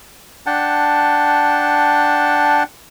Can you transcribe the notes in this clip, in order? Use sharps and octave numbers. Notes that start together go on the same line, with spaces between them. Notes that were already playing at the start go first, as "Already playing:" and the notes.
D4 F#5 G5 A5